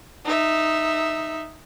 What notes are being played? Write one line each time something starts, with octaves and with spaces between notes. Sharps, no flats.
D#4 E5